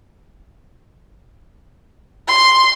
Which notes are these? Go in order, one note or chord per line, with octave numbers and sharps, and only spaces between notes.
C6